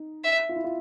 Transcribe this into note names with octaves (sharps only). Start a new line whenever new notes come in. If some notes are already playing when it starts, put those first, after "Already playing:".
Already playing: D#4
E5
F4
E4
F4